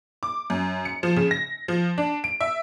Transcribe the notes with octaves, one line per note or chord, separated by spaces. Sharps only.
D6
F#2
C#7
F3
C#3
A#6
F3
D4
D7
E5